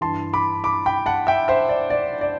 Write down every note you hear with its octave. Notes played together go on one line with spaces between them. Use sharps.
G2 E3 A5 C6
B5 D6
B5 D6
G5 B5
F#5 A5
E5 G5
C5 E5
D5
D5
D5